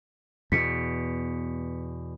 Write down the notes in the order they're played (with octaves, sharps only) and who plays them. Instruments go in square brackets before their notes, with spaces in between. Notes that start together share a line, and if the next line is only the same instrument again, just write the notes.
[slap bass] E2 B2 [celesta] B6 C#7